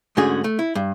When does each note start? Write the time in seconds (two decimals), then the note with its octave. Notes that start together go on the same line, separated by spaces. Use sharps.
0.17 G#2 D3 A3 C#4 F#4 G#4
0.44 A3
0.59 E4
0.75 G2